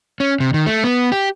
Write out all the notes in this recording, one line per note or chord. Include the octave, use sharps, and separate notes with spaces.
C#4
C3
D#3
A3
B3
G4